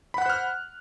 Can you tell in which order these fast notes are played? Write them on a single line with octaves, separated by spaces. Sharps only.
B5 F#5 F#6 C5 F6